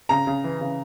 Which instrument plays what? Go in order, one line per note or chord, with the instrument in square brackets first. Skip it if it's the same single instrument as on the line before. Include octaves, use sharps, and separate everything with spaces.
[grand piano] C#3 [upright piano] A#5
[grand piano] C#3
E3
C#3